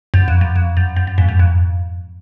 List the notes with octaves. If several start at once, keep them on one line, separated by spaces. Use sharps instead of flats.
F#2
F2
F#2
F2
F#2
F#2
F#2
F2 G#2
F#2
F2